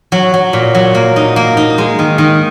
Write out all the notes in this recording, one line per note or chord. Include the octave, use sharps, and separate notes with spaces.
F#3
F#3
A#2
F#3
A#3
D#4
A#3
D#4
G#3
D#3
D#3